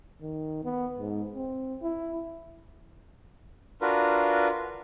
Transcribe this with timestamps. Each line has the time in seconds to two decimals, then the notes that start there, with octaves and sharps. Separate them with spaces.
0.22 D#3
0.64 B3
0.98 G#2
1.35 C4
1.82 E4
3.81 D4 F4 F#4 A#4 B4